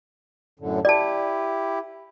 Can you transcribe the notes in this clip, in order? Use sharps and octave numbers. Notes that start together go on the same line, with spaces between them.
F#2 A2 D3
E4 G4 D5 A5